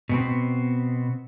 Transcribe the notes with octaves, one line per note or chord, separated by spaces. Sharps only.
B2 B3 C4